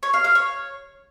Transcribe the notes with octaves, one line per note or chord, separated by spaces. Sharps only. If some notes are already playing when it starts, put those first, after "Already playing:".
C#5
F5
F5
C#5